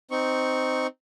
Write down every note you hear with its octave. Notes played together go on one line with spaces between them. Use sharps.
C4 D#4 C#6